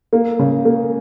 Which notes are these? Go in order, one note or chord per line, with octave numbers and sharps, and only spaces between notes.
A#3
C#3
A#3